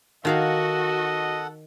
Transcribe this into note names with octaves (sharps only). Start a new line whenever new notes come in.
D#3 F#4 A4 D#5 F5 F#5 A#5